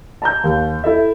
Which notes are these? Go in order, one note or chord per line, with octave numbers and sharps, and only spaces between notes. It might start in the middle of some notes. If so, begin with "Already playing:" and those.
A5 A#5 G6
D#2
E4 A4 E5